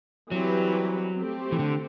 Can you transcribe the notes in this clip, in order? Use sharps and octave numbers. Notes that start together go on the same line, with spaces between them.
E3 F#3 G3 C4 G4 B4
A3 C4 G4
E3
D3